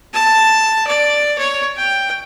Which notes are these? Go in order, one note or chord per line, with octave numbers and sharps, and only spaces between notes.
A5
D5
C#5
G5